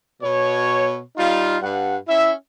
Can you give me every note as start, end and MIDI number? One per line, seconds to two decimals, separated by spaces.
0.22 1.00 47
0.22 1.00 73
1.17 1.57 55
1.17 1.57 63
1.17 1.57 65
1.62 1.96 43
1.62 1.96 78
2.08 2.32 61
2.08 2.32 64
2.08 2.32 76